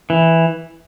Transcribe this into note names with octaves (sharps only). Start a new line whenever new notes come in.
E3